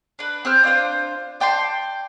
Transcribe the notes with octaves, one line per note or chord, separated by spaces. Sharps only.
D4 B4
C4 C5 E6 F6
D4 F4 C5
D5 G5 A5 C6